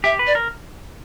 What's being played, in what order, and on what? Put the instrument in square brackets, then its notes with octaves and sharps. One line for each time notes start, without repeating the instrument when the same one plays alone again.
[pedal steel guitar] G4 [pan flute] E5
[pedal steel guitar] B4
[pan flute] D5
[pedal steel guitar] A#4